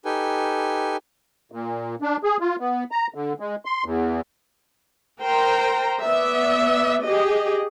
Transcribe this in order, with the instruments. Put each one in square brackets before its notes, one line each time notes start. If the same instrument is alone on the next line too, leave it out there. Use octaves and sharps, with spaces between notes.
[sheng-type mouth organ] D#4 G4 A4 B4 G5 G#5
[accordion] A#2
D4
G#4
F4
B3
A#5
D3
G#3
C6
E2
[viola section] A#4 C5 G5 A#5
B3 D5 E5
G4 G#4 D#5